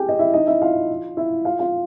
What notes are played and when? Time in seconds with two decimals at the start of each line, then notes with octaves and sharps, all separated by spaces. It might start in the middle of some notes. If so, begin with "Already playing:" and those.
Already playing: G4 G#4 G5 G#5
0.09 D#5
0.19 E4 E5
0.34 D#4 D#5
0.47 E4 E5
0.62 F4 F5
1.17 E4 E5
1.45 F4 F5
1.59 F4 F5